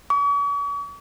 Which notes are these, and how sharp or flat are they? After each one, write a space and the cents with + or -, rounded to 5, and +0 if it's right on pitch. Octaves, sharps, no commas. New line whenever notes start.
C#6 +45